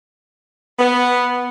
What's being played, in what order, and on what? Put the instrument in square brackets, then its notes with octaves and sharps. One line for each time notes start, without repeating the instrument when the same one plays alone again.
[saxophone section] B3